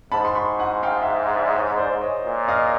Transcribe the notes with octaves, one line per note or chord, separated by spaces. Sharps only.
G#2 A5 B5
C6
B5 C#6
F#5 G#5
F5 G5
E5 F#5
D5 E5
C#5 D#5
C5 D5
C#5 D#5
A#2
D#5 F5